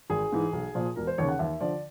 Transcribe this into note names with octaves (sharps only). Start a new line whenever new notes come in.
G#1 G#4
G#2 E3
B1
A#2 F3
E1 A#4
C5
D#2 C#3 C#5
F#5
D#2 E5
D3 F3 D5